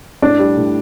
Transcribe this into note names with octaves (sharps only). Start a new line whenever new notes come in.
A2 D4
G3
A2